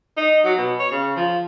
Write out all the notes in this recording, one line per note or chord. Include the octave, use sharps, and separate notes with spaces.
D#4
F#3
B2
C#5
C#3
F3